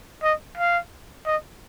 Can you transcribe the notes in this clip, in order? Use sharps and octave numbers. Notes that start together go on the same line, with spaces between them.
D#5
F5
D#5